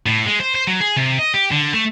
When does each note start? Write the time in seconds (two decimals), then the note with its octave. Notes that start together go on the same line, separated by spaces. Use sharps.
0.06 A2
0.26 G#3
0.40 C5
0.55 C5
0.67 F#3
0.80 G#4
0.96 C3
1.19 D#5
1.34 G4
1.51 D3
1.74 A3